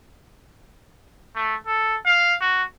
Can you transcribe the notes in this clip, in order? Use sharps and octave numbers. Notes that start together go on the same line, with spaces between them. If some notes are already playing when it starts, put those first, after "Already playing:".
A3
A4
F5
F#4